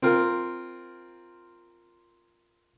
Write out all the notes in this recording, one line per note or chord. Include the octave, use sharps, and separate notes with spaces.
C4 F4 A#4